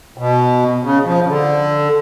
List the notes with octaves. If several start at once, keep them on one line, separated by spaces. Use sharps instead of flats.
B2
C#3
F3
C#3
D3